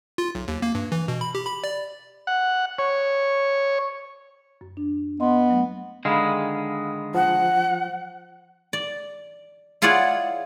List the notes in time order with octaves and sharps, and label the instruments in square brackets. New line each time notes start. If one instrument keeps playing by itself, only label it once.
[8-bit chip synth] F4
B1
D#2
A#3
G2
E3
B2
B5
G4
B5
D5
[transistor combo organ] F#5
C#5
[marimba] F#2
D4
[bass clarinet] B3 [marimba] D#5 C6
[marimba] F#3 A3
[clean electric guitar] D3 D#3 G#3 [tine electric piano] F5 B5
[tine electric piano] F3 [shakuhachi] F#5
[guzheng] D5
E4 F4 G#4 C#5 D5 F#5